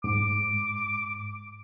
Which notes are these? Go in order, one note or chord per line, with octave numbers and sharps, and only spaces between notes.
G#2 D6